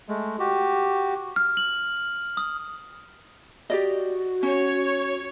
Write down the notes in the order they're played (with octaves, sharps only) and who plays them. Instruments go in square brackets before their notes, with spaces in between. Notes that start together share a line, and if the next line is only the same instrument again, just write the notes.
[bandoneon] G#3 A3
F#4 G4
[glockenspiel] F6
F#7
D#6
[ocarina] F#4 [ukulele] G4 D5 D#5
[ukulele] C#4 [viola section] C#5